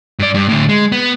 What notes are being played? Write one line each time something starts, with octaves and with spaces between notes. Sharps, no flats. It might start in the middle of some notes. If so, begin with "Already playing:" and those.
G2 D5
G2
A2 D3
G#3
B3